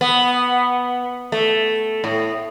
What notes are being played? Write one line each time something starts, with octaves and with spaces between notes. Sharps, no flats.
B3
A3
A2